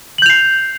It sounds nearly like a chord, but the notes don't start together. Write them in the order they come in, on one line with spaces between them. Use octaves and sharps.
F#7 G6 F7 C7